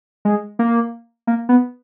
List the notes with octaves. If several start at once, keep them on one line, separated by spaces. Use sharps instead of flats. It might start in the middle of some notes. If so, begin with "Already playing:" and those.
G#3
A#3
A#3
B3